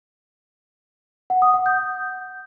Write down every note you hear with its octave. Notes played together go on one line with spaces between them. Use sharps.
F#5
D#6
F#5
G6